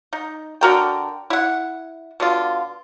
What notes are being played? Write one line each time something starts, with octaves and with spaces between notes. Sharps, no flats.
D#4
D3 F#4 A#4 G5
E4 F#5
B2 D3 F4